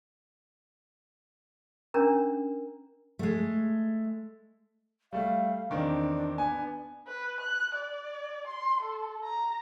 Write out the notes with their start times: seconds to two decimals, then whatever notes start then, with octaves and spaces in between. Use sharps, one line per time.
1.94 C#4 D4 A#4 A#5
3.19 G#3 A3
5.13 G3 A3 F5
5.70 E2 D#3 C4 D4
6.38 B3 G#5
7.07 B4
7.41 F#6
7.75 D5
8.47 C6
8.83 A4
9.24 A#5